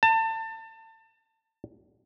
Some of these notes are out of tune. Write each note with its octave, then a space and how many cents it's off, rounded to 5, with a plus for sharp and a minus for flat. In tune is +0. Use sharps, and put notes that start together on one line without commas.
A5 +30